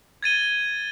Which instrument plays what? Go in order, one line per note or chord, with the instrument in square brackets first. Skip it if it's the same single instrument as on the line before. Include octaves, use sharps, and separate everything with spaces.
[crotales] G#6 A6 D#7 G7